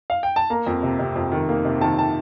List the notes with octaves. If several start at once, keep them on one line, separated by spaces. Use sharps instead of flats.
F5
G5
A5
A#3 A#5
F2
C3
C3
F2
D#3
A#3
C3
D#3 A5
A5